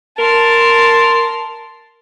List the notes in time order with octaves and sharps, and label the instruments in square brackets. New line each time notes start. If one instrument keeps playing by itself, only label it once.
[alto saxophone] A#4 [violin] A5 C6